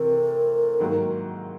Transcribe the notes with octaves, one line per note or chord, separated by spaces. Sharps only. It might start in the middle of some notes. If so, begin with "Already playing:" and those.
Already playing: C3 E3 A3 C4 A#4
G#2 D#3 F#3 A#3